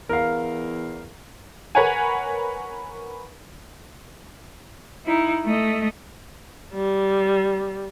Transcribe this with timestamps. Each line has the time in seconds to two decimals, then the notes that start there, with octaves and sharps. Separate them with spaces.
0.09 E2 A#4 F5
1.75 A#4 B4 C#5 F#5 G#5
5.06 D#4 E4
5.46 A3 D#5
6.74 G3